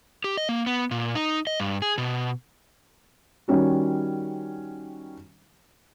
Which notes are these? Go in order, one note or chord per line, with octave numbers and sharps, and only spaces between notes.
G4
D#5
A#3
B3
A#2
D#4
D#5
G2
G#4
B2
D#3 G3 C#4 F#4